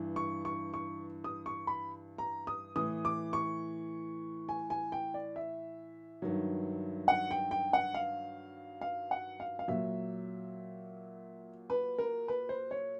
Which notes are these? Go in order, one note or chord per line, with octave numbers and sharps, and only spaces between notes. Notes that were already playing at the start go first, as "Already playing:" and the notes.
Already playing: G2 E3
C#6
C#6
C#6
D#6
C#6
B5
A#5
D#6
A2 E3 D#6
D6
C#6
G#5
G#5
G5
D5
E5
G2 D#3 F#3
F#5
G5
G5
F#5
F5
F5
F#5
F5
F5
A#2 F#3 E5
B4
A#4
B4
C5
C#5